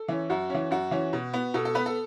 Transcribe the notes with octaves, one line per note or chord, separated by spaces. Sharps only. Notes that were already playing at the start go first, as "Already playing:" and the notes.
Already playing: A4
E3 C#4
F#2 F#4
E3 C#4
F#2 F#4
E3 C#4
B2
B3
B2 A4
A4
B3 B4
A4